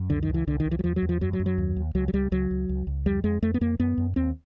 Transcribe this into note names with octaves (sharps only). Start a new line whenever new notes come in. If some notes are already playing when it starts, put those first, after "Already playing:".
Already playing: F#2
C#2 D3
D#3
C#2
E3
C2 D3
D#3
C2
E3
F#3
E2 F3
F#3
E2
F3
F#2 F#3
F#3
F#2
F#3
D#2
D#2
C#2 F#3
F#3
C#2 G3
C#2 F#3
C#2
C#2
C#2
F2 G3
F2 G#3
F2 A3
B3
F2 A#3
F#2 B3
F#2
D#2 C4